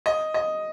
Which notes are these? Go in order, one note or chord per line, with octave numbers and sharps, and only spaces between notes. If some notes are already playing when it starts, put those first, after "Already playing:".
D#5
D#5